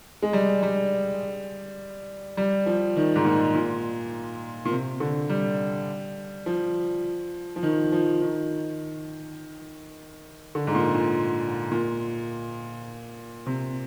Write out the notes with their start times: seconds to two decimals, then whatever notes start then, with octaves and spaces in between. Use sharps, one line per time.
0.22 G#3
0.33 G3
0.63 G3
2.37 G3
2.66 F3
2.96 D#3
3.16 G#2
3.25 A#2
3.55 A#2
4.65 A#2
4.71 C3
5.00 D3
5.29 G3
6.46 F3
7.56 F3
7.63 D#3
7.92 F3
8.22 D#3
10.55 D3
10.67 G#2
10.75 A#2
10.94 A#2
11.72 A#2
13.46 C3